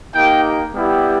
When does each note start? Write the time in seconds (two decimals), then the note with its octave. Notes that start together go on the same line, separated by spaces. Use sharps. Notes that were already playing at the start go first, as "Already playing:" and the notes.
0.15 A#3 D#4 G4 G5
0.74 G3 B3 E4 G4